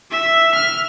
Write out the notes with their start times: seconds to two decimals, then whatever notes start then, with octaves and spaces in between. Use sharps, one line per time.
0.11 E5
0.55 F6